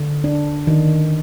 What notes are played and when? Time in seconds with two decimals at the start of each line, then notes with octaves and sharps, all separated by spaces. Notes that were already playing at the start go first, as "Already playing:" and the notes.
Already playing: D3
0.24 D4
0.67 D#3